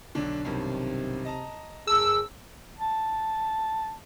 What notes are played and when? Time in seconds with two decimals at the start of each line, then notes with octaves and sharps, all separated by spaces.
0.15 B1 D3 D4
0.45 B1 G2 C3 D#3
1.25 D#5 A5 A#5
1.87 G1 G#4 A#4 A5 E6
2.78 A5